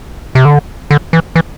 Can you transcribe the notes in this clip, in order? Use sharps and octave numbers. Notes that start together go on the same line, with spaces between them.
C3
D3
D3
E3
E3